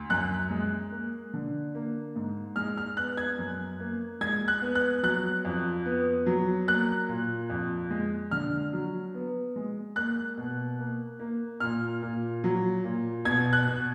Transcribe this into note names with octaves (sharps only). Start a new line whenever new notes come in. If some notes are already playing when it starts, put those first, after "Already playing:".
Already playing: D2
F#2 F#6
G#3
A#3
D3
A#3
G#2
G#3 F6
F6
B3 F#6
G#6
F#2
A#3
G#3 G#6
F#6
B3
F#6
F#3 F#6
F2
B3
F#3
A#3 F#6
A#2
F2
G#3
D3 F6
F#3
B3
G#3
A#3 F#6
B2
A#3
A#3
A#2 F6
A#2
F#3
A#2
B2 G#6
F#6
B2